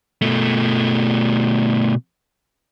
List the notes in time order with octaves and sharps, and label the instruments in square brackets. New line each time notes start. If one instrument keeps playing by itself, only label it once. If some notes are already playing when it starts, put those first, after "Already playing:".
[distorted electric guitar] B2 A3